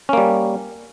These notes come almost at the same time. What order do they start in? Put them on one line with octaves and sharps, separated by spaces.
C#4 A#3 G3